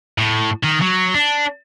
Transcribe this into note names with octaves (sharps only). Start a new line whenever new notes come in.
A2
D#3
F#3
D4